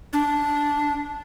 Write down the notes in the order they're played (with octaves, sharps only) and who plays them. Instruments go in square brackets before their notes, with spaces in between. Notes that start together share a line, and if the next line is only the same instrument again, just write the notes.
[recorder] D4